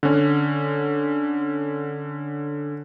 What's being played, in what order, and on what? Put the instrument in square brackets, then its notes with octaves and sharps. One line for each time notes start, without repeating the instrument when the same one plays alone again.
[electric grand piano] D3 C#4